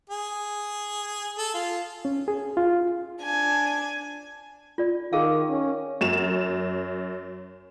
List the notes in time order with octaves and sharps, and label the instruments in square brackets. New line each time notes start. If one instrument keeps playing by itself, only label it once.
[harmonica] G#4
A4
F4
[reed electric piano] C#4
G#4
F4
[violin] D4 G#5
[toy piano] F4 D5
[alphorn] D#3 [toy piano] G#4 A#4 F5
[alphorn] C#4
[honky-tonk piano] F#2 E7 F7